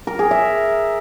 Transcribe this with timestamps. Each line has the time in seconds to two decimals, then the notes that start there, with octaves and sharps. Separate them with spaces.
0.07 A#4
0.19 G#4
0.31 E5